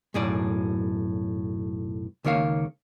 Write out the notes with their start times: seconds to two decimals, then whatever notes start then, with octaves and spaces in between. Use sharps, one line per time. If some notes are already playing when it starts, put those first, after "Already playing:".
0.14 B1 F#2 A2 G#4 D5
2.24 C#2 D#3 A#3 C#5 F5